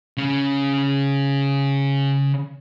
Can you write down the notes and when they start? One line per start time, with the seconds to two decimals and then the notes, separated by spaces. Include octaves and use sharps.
0.17 C#3 C#4